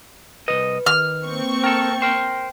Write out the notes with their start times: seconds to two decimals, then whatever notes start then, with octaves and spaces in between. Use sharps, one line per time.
0.48 C2 D#3 B4 D#5
0.86 D#3 F6
1.25 A#3 C4 C#6
1.64 A4 A#4 G5 A6
2.02 A#4 C5 G5